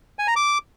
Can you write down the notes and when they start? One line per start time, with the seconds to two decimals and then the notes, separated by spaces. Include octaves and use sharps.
0.19 G#5
0.27 A#5
0.36 D6